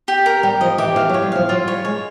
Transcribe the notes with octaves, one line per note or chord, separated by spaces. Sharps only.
G4
A#4
G3 G4
F3 D#5
E3 G4
E3 F5
F#3
C#5
G3
F3 F5
F#3 F4
G3 C#5
G#3 C#5